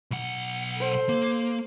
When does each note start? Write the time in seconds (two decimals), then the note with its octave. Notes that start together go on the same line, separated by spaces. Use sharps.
0.11 B1 F#5
0.77 A4 C5
1.09 A#3